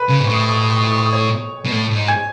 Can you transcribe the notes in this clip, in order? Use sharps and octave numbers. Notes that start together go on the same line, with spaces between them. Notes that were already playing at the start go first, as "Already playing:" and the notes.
Already playing: B4 B5
C#3
G#2
A2 C#6
D#6
C#6
D#6
C#6
D#6
C#6
D#6
C#6
D#6
C#6
D#6
C#5 C#6
B2
A2
A2
G#2
G#5 G#6